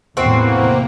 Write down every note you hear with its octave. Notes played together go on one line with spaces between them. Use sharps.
E2 A2 C3 E3 A#3 C4 F#4